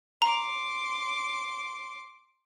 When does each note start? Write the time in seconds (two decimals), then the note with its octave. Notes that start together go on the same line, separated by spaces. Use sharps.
0.22 A#5 C6 D6